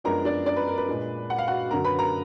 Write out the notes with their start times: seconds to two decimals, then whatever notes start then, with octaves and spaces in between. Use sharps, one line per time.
0.04 F#2 F3 G#3 B3 D4 A#4 A#5
0.25 D4 D5
0.46 D4 D5
0.56 B4
0.68 A#4
0.78 B4
0.89 A#2 G#3 D4
1.30 F#5
1.38 F5
1.48 F#4 F#5
1.71 F#2 D3 F#3 A#4 A#5
1.85 B4 B5
1.99 A#4 A#5